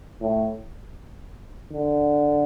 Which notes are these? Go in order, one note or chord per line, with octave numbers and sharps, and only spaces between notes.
A2
D3